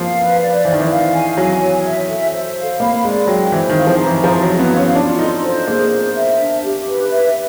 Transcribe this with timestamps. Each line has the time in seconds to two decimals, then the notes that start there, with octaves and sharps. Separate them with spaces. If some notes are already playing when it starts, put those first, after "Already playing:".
Already playing: F3 A#3 F5
0.17 B4
0.41 D5
0.65 E3 C5
0.72 D#3
0.79 E3
0.89 F5
1.13 G#5
1.36 F#3 G#5
1.60 C#5
1.85 E5
2.08 A4
2.32 C5
2.56 F5
2.80 A#3 B5
3.04 G#3 D5
3.27 F#3 G5
3.52 E3 C5
3.69 D#3
3.76 F5
3.87 F3
4.00 A#5
4.05 E3
4.24 F3 A#5
4.42 F#3
4.48 C#5
4.59 B3
4.71 F5
4.77 C#4
4.95 D4 F4
5.19 D#4 A4
5.43 C5
5.67 A#3 G#4
5.91 C5
6.15 E5
6.39 D4
6.63 G4
6.86 B4
7.11 E5